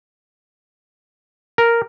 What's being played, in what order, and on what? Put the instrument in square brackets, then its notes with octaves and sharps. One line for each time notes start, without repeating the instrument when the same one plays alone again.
[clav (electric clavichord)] A#4